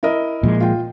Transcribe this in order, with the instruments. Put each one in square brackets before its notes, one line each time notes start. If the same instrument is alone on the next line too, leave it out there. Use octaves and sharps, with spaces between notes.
[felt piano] E4 A#4 D#5
[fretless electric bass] A#2 F3 G#3
[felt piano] F4 G5